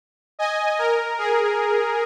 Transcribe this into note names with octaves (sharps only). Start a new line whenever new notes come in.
D#5 G#5
A#4
G#4